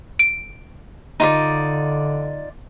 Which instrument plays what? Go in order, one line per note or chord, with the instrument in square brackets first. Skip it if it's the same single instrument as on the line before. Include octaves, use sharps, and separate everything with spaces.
[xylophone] D7
[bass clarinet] D3 [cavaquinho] D#4 F4 D5